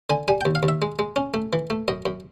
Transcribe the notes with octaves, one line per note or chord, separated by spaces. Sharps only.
D3 G#5
G3 G#5
G5
D#2
F5
D#2
E5
G#3
G#3
C#4
A3
E3
A3
F#2 D#5
F#2